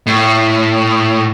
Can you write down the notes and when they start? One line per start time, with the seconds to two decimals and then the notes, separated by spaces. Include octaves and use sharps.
0.06 A2